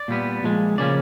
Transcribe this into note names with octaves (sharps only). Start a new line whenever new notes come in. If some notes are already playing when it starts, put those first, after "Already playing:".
Already playing: D5
A#2 G3 B3
A#2 F3 G#3
C#3 F3 A#3 C#4 D5